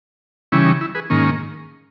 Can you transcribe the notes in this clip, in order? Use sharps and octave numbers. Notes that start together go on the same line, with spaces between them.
C#3 E3 G3 C#4 E4
D#4
E4
G#4 B4
G#2 D#3 A#3 C#4